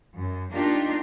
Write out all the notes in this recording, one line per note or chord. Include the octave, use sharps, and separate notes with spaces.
F#2
A#3 D4 D#4 F4 G4